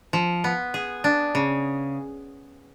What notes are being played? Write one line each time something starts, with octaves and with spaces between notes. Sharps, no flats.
F3
B3
G#4
D4
C#3